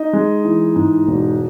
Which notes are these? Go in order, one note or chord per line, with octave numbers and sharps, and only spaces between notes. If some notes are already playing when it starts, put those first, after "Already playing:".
Already playing: D#4 D#5
G#3
E3
G#2
E1